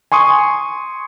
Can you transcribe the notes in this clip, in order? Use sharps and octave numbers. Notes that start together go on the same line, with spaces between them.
G#5 C6 C#6 D#6